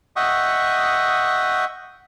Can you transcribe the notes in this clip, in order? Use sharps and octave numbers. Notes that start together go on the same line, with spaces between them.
D#5 E5 F#5 G5 C#6 D#6